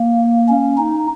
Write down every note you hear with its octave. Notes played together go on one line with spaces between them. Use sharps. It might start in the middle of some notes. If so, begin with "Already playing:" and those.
Already playing: A#3
C#4
D#4